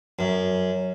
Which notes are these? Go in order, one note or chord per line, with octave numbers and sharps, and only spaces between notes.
F#2